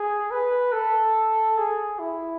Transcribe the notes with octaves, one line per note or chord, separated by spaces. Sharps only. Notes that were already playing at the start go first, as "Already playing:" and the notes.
Already playing: G#4
B4
A4
G#4
E4